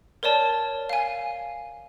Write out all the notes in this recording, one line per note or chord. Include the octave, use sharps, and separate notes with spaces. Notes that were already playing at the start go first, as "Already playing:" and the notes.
A#4 C#5 D5 A5
F5 G#5